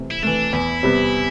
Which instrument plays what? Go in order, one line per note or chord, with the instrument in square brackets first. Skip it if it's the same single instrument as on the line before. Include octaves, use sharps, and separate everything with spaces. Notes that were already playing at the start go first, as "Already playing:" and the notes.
Already playing: [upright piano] C3 E3 A3
[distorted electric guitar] E4
[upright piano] E3 A3 [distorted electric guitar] D4
[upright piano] E2 [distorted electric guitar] E4
[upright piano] C3 G3 B3